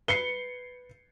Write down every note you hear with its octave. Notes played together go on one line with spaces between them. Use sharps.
B4 C7 C#7 G7